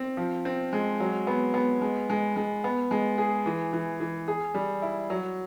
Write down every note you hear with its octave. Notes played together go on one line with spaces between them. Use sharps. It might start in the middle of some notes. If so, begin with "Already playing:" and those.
Already playing: C4
F3
C4
G#3
F#3
B3
B3
G#3
G#3
G#3
B3
G#3
G#4
E3
E3
E3
G#4
G3
E4
F#3